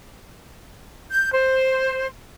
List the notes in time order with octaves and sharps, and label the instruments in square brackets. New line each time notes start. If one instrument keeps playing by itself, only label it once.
[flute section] G6
C5